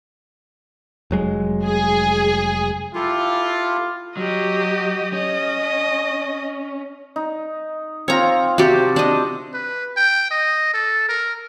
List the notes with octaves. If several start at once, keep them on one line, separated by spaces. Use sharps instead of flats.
F1 F#3 G#3
G#4
E4 F4 G4 A4
F#3 G4 D#5
C#4 D#5
D#4
C4 F4 C#5 A#5
C3 F#4 G4 A5 C6
D4 D#5
B4
G5
D#5
A4
A#4